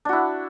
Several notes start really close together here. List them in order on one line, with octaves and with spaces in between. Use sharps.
D4 F#4 E4